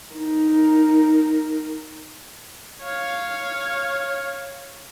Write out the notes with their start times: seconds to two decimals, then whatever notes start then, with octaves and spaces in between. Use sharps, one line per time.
0.13 D#4 A#4
2.82 C#5 F5